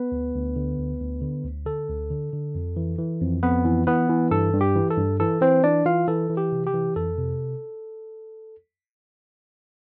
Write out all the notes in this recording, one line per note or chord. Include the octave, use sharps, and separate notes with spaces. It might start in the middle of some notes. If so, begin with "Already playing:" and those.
Already playing: B3 B4
D2
D2
D3
D2
D2
D3
D2
D3 A4
D2
D3
D3
F2
E3
E3
F2
F2 B3 B4
E3
E3 B3 B4
E3
G2 A4
G2
G4
E3
A4
G2
E3 A4
E3 C4 C5
E3 D4 D5
E3 F4 F5
E3 A4
E3
G4
C3
G4
E3
F2 A4
C3